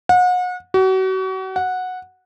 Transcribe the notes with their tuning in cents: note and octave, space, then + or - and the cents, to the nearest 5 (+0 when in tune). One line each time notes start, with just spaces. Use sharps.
F#5 -35
F#4 +35
F#5 -10